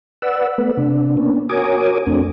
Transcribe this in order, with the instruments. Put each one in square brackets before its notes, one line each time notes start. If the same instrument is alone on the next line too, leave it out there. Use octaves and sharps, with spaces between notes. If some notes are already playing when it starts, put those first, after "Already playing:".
[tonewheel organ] B4 D5 F#5 E6
A3 B3 B4
C3 D4
A#3 B3 C#4 D4
F#4 A#4 C#5 G#5 D6 D#6
F2 A3 C4 D4